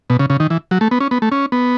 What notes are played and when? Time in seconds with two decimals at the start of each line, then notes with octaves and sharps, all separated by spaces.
0.10 B2
0.19 C#3
0.30 C#3
0.40 D#3
0.50 E3
0.71 F#3
0.81 A3
0.91 B3
1.00 C#4
1.11 B3
1.22 A3
1.32 C#4
1.52 B3